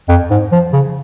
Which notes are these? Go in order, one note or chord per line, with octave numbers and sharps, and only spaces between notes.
F2
G#2
F3
C#3